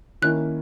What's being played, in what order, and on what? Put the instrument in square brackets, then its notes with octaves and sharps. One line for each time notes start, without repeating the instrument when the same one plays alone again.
[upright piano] D#3 A#3 C#4 E4 [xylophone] F#6